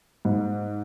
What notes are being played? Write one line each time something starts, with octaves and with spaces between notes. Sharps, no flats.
G#2